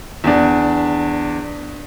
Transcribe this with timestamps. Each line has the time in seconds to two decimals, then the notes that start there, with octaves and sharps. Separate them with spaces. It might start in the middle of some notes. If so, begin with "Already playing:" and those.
0.24 E2 D4